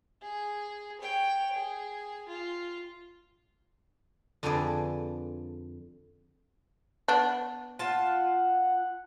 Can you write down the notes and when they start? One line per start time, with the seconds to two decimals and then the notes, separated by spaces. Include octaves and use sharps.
0.22 G#4
1.01 C#5 G5
1.53 G#4
2.28 F4
4.43 F2 D3 F3 G#4 B4 D5
7.08 B3 D4
7.79 F4 F#5 A5